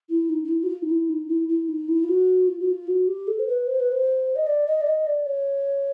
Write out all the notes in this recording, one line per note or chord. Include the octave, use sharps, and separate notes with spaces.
E4
D#4
D#4
E4
F#4
F4
D#4
E4
D#4
E4
E4
D#4
E4
F4
F#4
F4
F#4
F4
F#4
G4
A4
C5
B4
C5
B4
C5
D#5
D5
D#5
D5
D#5
D5
C#5